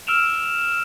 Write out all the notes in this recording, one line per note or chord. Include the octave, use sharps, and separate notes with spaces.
E6 F6 D7 E7 F7